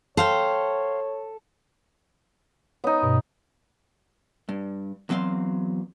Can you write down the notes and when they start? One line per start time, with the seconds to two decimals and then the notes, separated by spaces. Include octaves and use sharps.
0.17 A4 C5 C#5 F5 G5
2.84 B3 D#4 C#5
3.02 G2 B2
4.49 G2
5.09 E2 F#3 C4 D#5 F5 C6